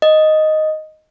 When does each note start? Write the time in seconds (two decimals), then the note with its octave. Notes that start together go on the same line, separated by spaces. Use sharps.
0.02 D#5